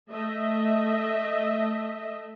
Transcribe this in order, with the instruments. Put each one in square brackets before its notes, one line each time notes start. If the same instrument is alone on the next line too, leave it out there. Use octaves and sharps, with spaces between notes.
[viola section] A3 D#5 E5